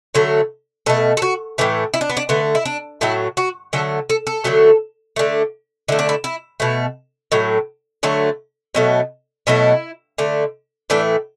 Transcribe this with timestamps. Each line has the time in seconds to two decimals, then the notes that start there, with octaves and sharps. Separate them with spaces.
0.14 D3 F#3 A3
0.86 B2 A3 A4
1.17 A4
1.22 F#4
1.58 A2 E3 A3
1.94 E4
2.01 D4
2.10 B3
2.17 D4
2.29 D3 A3 B3
2.55 E4
2.65 D4
3.01 A2 F#3 A3 E4
3.37 F#4
3.73 D3 F#3 A3 A4
4.10 A4
4.27 A4
4.44 D3 F#3 A3
5.16 D3 A3
5.88 D3 A3 E4
5.99 D4
6.09 E4
6.24 E4
6.60 B2 A3
7.32 A2 F#3 A3
8.03 D3 F#3 A3
8.75 B2 F#3 A3
9.47 B2 F#3 A3 E4
10.18 D3 A3
10.90 A2 E3 A3 D4